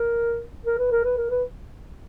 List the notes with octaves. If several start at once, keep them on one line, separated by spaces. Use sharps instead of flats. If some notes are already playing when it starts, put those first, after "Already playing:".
Already playing: A#4
A#4
B4
A#4
B4
A#4
B4